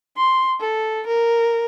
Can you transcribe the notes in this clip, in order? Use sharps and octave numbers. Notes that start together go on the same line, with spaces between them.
C6
A4
A#4